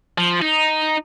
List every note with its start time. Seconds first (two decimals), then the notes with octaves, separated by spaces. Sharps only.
0.18 F3
0.42 D#4